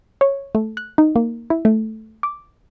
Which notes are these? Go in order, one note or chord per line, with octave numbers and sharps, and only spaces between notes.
C#5
A3
F#6
D#4
A#3
E4
A3
D6